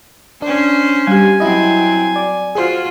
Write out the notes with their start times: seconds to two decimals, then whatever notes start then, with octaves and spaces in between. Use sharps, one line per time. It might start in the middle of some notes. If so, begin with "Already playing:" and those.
0.42 C#4 D4 C5
1.07 G3 G4 G#5
1.40 F#3 C4 E4 D#5
2.16 D5
2.55 F4 F#4 G#4 C5